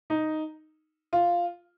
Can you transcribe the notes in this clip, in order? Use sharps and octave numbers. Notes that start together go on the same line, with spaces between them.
D#4
F4